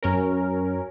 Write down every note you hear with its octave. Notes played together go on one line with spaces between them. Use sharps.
F#2 C#4 A#4